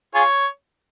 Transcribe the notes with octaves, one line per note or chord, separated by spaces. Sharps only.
F4 G#4 C#5